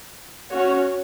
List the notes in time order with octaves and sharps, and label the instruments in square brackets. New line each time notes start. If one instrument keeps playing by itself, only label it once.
[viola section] C#4 F#4 C#5